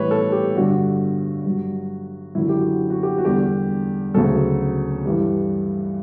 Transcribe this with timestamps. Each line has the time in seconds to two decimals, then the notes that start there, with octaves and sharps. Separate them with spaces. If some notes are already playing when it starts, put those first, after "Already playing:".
Already playing: A2 E3 G3 B4 C#5
0.11 A4
0.32 G4
0.55 G2 D3 G3 F#4
1.45 G2 F#3
2.35 F#2 D3 F#3 E4
2.49 G4
2.57 F#4
2.90 F#4
3.03 G4
3.18 F#4
3.25 E2 D3 G3 G4
4.14 D2 C#3 F#3 A4
5.06 G2 E3 G3